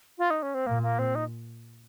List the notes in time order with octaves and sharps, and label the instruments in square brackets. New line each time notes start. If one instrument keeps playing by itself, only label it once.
[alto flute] F4
D#4
C#4
C4
[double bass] A#2 [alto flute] A#3
[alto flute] A#3
C4
D#4